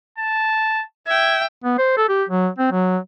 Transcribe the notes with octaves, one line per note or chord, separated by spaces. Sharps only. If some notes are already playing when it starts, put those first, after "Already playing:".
A5
E5 G5 G#6
B3
C5
A4
G4
F#3
C4
F#3